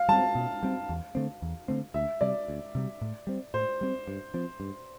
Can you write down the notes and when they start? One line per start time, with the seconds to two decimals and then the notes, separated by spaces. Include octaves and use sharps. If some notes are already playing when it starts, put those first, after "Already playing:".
Already playing: F5
0.09 G3 C4 A5
0.35 B2
0.63 G3 C4
0.89 E2
1.15 D3 A3 C4
1.42 E2
1.68 D3 A3 C4
1.94 D2 E5
2.21 C3 G3 D5
2.48 D2
2.75 C3 G3
3.01 A2
3.27 G3 C4
3.54 A2 C5
3.81 G3 C4
4.08 G2
4.34 F3 C4
4.60 G2